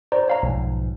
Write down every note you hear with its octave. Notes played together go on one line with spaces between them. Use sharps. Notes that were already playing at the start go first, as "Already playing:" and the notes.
C5 D5 A#5
C#5 F5 A#5
B1 G#2 F3